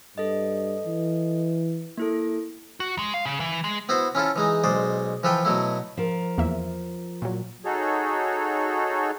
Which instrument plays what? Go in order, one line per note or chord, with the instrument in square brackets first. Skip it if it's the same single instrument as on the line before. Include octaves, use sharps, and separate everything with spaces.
[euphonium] G2 [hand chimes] A4 D#5
[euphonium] E3
[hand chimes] A#3 E4 A4
[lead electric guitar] F#4
G#3
F5
C#3
E3
G#3
[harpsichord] B3 E4 F#4 C5
C#4 E4 F4 A4
E3 G#3 D#4
B1 G#3 C5 D5
E3 F3 A4 B4 G5
B2 F#3 A3 E4
[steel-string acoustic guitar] F3 A#4
[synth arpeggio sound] E2 A#3 E5
A#2 F#3
[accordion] D#4 F#4 G#4 A4 C#5